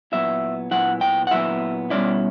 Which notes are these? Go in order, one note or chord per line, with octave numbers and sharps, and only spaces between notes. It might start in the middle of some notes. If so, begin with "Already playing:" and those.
A#2 F#3 B3 E4 E5
A#2 F#3 B3 E4 F#5
G5
F#5
A#2 F#3 B3 E4 E5
B2 G3 C#4 E4 D5